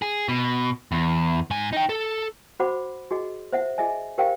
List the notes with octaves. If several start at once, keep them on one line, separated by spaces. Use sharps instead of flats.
G#4
B2
E2
G#2 G#5
D#4 G5
A4
F#4 C5 F#5 B5 D6
F#4 G#4 D#5
C5 E5 F#5
G#4 D#5 E5 G#5
G4 A#4 C5 F5 G5